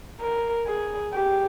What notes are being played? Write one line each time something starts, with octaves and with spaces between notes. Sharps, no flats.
A#4
G#4
G4